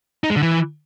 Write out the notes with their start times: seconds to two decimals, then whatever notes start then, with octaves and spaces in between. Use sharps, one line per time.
0.24 D#4
0.30 G#3
0.36 D3
0.42 E3